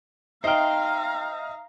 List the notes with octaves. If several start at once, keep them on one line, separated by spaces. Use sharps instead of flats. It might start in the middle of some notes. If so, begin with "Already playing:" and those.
D#4 C5 E5 F5 G5 A#5 F6